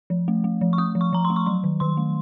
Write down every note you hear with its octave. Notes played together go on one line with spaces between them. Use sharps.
F3
A3
A3
F3
C#6
A3 D#6
F3
C#6
F3 A#5
C6
A3
C#6
F#3 C6
D#3
D#3 C6
A3